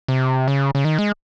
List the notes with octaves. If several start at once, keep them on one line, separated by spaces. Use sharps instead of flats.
C3
C#3
C#3
D#3
G#3